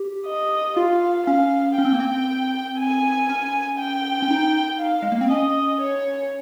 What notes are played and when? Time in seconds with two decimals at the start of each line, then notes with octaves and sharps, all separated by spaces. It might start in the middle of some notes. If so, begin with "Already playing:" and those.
Already playing: G4
0.27 D#5
0.77 F4 F5
1.27 C#4 F5
1.77 C#4 G5
1.85 C4
1.93 A#3
2.00 C4
2.78 G#5
3.29 C#4
3.79 G5
4.22 C#4
4.30 D#4
4.80 F5
5.02 G#3
5.12 A#3
5.21 C4
5.31 C#4 D#5
5.81 C#5